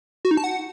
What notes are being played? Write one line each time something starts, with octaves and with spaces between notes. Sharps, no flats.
F#4
D#4
A5
F#5